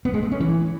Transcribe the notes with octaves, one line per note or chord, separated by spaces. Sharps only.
B3
G#3
A3
C#4
E3